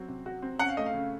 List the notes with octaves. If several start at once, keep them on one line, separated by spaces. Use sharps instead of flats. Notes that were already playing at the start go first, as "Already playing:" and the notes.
Already playing: F#3 C4
C3
F#4
C4
C#4 F#5
F5
A3 D#5
F5
C#3